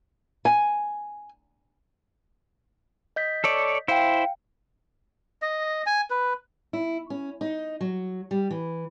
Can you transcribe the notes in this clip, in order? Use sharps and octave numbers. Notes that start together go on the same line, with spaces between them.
G#5
D#5 G6 B6
A4 C#5 D5
E4 C5 F5 G5
D#5
G#5
B4
E4
C#4
D#4
F#3
G3
E3